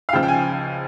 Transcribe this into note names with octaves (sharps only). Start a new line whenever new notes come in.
F5
C#2 C#3 F3 G5
G5
G#5